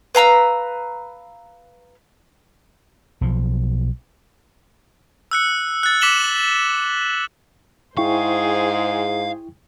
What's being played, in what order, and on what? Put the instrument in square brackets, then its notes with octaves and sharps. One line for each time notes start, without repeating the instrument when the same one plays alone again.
[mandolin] B4 F5 A#5 E6
[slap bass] B1 F3
[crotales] E6 F#6 C#7
F#6 A6
D6 B6 E7 F#7 G7
[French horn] G#2 [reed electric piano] E4 G5 C#6 [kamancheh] G#4 C5 [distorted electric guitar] F5